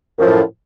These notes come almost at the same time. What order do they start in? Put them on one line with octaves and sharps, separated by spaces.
F#2 F3 A2